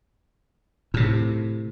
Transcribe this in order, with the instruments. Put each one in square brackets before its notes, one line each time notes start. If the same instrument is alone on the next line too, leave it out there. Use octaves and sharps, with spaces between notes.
[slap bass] A2 C3